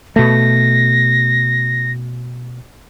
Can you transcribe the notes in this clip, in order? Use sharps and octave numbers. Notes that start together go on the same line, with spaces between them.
B2 A3 A#6